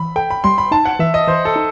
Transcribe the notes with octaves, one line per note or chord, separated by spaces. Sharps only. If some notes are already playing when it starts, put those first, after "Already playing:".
Already playing: E3 B5
A4 G5
B5
G3 C6
B5
D#4 A5
F#5
E3 E5
D#5
E3 C5
A4
D#4